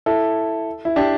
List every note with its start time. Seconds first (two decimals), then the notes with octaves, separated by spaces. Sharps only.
0.06 E4 A4
0.85 E4
0.96 D4 G4